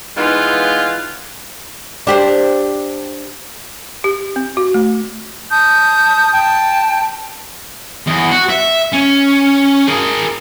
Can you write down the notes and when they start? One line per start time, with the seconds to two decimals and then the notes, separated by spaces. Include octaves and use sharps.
0.17 E3 G#3 B3 D#4 F4
2.07 D4 G4 C5
4.04 G4
4.36 C4
4.57 F#4
4.74 A3
5.50 A5 D#6 G6
6.31 G5 A5
8.07 E2
8.31 F#4
8.50 E5
8.92 C#4
9.87 G#4 A#4